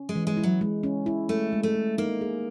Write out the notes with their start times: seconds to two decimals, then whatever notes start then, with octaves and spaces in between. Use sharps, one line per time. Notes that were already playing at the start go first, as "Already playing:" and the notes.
Already playing: C#4
0.09 G#3
0.15 E3
0.27 G#3
0.37 E4
0.43 F#3
0.61 G#3
0.83 C#4
1.06 E4
1.29 G#3 A3
1.52 G#3
1.63 A3
1.75 G#3
1.98 A#3 D#4
2.21 G#4